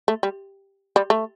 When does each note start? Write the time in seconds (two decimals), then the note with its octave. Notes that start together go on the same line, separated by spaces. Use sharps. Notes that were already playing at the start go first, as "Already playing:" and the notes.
0.08 A3
0.23 G3
0.96 G3
1.10 A3